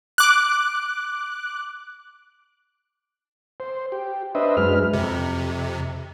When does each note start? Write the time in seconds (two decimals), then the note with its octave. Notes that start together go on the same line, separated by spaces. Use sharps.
0.18 D6 F#6
3.60 C5
3.92 G4
4.35 D4 B4 C5 D#5 E5
4.57 F#2 G#3 B4 F6
4.93 F2 C3